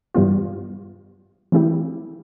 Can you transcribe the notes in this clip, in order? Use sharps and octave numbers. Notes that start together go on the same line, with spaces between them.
G2 E3 G3 B3 F4
E3 A3 C4 E4 G4